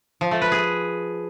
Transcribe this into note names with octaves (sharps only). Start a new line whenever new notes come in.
F3
A3
B4
G#4